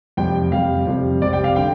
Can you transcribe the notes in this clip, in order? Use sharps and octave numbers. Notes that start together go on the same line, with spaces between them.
F2 C3 G3 G5
F2 C3 G3 F5
F2 C3 G3
F2 C3 G3 D5
G5
F5
D3 G5